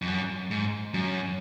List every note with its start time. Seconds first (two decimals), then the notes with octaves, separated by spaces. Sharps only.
0.02 F2
0.07 F#2
0.51 G#2
0.94 F#2